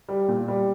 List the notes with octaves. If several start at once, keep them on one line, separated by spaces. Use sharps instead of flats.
G3
A#2
G3